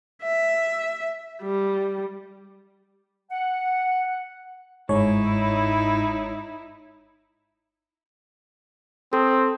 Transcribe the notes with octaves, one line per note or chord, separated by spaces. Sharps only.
E5
G3
F#5
G1 G#2 G#3 D#4 E4 C#5
C4 A4